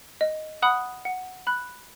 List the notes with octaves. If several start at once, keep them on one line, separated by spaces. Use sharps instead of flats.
D#5
F#5 B5 D#6 F#6
F#5
B5 F#6